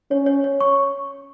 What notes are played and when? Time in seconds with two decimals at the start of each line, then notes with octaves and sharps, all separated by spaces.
0.10 C#4 C#5
0.26 C#5
0.44 C#5
0.61 C#6